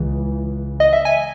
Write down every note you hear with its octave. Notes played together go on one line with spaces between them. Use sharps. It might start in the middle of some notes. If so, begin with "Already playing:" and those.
Already playing: C#2 C#3 E3
D#5
E5
G#5